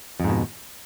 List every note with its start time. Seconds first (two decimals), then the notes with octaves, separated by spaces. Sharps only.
0.20 F2
0.24 G#2
0.29 B2